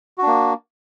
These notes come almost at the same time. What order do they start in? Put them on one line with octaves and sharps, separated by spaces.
F#4 D4 A#3